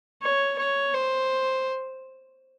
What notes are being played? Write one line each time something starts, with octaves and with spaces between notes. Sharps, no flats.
C#5
C#5
C5